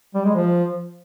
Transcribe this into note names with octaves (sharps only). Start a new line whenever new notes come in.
G3
G#3
F3